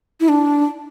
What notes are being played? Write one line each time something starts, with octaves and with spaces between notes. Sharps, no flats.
E4
D4